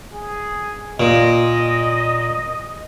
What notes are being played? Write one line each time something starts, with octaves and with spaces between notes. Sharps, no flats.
G#4
A#2 D#5